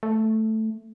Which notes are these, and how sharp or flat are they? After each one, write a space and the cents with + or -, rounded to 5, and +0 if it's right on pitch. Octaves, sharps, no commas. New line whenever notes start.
A3 +0